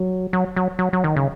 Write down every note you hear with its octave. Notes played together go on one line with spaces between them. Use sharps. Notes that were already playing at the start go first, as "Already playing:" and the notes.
Already playing: F#3
F#3
F#3
F#3
F#3
D#3
C#3